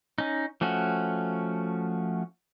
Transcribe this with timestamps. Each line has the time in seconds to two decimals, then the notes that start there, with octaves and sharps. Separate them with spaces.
0.18 C#4 D#4
0.61 F3 A3 C#4 F#4